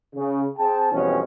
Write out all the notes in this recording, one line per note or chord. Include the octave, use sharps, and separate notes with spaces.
C#3
C4 G#4 G5 A5
F2 B2 E3 G3 C#4